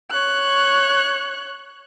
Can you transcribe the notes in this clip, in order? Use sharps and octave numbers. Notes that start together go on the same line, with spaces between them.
C#5 F#6